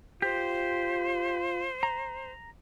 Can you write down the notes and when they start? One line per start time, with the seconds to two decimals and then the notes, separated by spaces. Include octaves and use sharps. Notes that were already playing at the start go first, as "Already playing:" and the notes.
0.22 F4 G4 C5
1.83 A#5